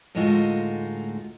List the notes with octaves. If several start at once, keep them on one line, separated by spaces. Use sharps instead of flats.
D2 A2 G#3 D#4 F4 F#4